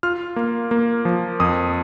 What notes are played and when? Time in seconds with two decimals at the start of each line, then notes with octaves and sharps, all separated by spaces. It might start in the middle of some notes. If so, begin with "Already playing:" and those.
0.03 F4 F6
0.36 A#3
0.71 A#3
1.05 F3
1.40 F2 D#6